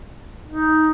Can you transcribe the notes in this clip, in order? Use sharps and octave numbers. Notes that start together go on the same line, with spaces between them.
D#4